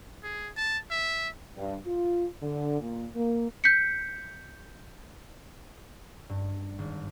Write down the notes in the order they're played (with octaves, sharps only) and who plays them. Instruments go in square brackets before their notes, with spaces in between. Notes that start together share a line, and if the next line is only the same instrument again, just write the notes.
[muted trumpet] G#4
A5
E5
[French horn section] G2
F4
D3
A#2
A#3
[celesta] G6 B6 C#7
[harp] G2
G#1